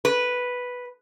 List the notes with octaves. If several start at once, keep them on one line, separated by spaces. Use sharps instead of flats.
B4